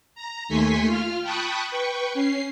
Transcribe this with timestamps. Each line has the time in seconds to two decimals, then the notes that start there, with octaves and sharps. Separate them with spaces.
0.15 A#5
0.48 D#2 A3 G#5 C6 C#6 B6
0.86 F4 F6
1.22 G5 A5 B5 C#6 D#6 F#6
1.71 B4 G5 C#6
2.14 C#4 C7